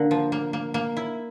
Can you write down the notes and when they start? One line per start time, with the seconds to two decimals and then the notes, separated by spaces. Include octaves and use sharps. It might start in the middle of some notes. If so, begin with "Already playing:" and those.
Already playing: D3 A#3 A#4
0.11 F3
0.32 A#3
0.53 A#3
0.74 A#3
0.97 E4